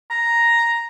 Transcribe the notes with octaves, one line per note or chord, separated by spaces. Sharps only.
A#5